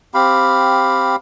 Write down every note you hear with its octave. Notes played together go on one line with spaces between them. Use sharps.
C4 G4 F5 B5